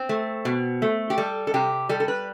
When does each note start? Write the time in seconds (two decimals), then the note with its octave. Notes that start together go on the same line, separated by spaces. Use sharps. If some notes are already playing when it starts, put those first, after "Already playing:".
Already playing: C4
0.09 A3
0.45 B2
0.82 A3
1.10 G4
1.18 G3 A4
1.47 A4
1.54 C3 G4
1.89 G3 A4
2.00 A4
2.08 B4